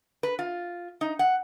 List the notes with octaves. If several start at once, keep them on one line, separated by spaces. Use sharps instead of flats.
B4
F4
D#4
F#5